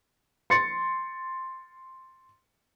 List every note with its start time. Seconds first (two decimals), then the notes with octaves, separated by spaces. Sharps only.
0.50 C6 A6 C#7